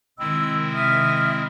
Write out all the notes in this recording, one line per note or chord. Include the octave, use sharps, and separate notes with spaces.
C3 D#3 G#3 C4 E4 E6
E5 D#6 F6